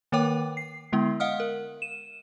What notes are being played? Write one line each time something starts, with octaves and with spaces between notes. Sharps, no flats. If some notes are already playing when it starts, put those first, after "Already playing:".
D#3 A#3 A#4 C#5 G5 D6
C7
D3 G#3 B3 E4
D#5 F5 F#5 D#6 F6
A#4
D#7 E7